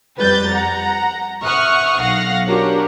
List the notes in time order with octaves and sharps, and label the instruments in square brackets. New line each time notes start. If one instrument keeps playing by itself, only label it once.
[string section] F2 G3 B4 G6 A6
F#5 A#5
E5 F#5 C#6 D#6 F6 F#6
B1 F5 F#5 A#6
D4 F#4 G4 A#4 C#5